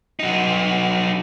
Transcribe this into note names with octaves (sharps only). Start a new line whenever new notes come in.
F#3 D#4